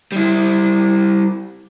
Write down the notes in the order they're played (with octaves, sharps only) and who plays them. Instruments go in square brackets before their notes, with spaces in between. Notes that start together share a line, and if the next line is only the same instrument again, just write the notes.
[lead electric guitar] G3 E4